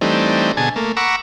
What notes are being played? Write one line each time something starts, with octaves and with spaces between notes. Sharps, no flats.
E3 G3 A3 C4 D4 D#4
B2 D3 G#4 G#5 A5
A3 A#3
F#5 A#5 B5 C#6 D6 E6